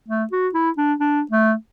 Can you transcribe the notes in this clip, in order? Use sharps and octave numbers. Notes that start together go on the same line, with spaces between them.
A3
F#4
E4
D4
D4
A3